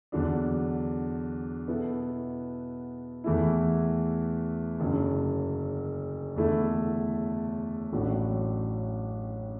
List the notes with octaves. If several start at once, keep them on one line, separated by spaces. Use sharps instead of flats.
E2 D3 F#3 D4
B2 B3 E4 A4
E2 E3 A3 E4
F#1 F#2 D3 F#3
E2 D3 A3 E4 A4
A1 A2 F#3 D4 F#4